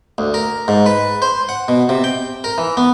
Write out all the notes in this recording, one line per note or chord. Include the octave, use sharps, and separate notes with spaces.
D2
A#4
G#2
B4
C5
F#5
B2
C3
G5
A#4
E3
B3